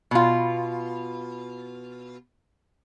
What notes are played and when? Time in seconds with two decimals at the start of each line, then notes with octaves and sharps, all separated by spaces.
0.11 B2 F4